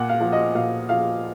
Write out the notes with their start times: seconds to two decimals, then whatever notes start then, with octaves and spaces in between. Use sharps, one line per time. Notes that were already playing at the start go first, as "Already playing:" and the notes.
Already playing: A#2 F#5
0.09 F5
0.20 F3
0.32 D#5
0.55 A#2 F5
0.89 F3 F5